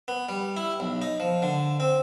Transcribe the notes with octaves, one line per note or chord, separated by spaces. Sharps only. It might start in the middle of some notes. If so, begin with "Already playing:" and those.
B3
G3
E4
B1
D#4
F3
D3
C4